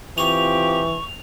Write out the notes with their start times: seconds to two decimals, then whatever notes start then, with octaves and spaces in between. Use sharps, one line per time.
0.18 E3 C4 F4 G4 C#6 F7